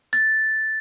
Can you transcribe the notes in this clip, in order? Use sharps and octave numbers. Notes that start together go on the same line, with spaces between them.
A6